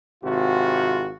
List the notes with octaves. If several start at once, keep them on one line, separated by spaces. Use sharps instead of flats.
G#1 C3 F4 F#4